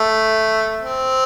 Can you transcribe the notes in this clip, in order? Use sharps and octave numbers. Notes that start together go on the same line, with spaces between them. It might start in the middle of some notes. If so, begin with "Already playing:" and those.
Already playing: A3
C4